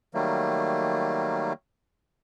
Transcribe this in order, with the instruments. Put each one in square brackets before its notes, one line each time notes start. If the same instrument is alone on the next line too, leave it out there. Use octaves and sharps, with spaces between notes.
[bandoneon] D#3 F#3 G3 A3 A#3